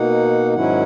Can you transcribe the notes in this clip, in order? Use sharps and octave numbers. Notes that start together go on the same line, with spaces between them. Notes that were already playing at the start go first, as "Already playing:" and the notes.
Already playing: B2 A#3 D#4 F#5
G#2 D#3 F#3 C#4 E4 F#5